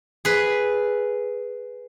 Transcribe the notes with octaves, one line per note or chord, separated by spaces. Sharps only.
G#4 B4